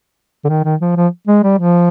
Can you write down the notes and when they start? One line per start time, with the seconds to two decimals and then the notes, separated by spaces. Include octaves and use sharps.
0.44 D3
0.49 D#3
0.64 D#3
0.81 F3
0.96 F3
1.27 G#3
1.43 G3
1.58 F3